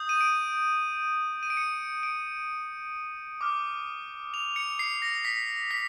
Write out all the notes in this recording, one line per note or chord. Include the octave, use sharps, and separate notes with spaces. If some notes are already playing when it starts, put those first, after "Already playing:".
Already playing: D#6 G6
D#7
D7
D#7
D7
C#7
D7
D6 F6
F7
C#7
C7
A#6
B6
B6